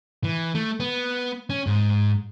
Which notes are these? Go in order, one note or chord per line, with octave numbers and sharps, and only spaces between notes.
E3
A3
B3
C#4
G#2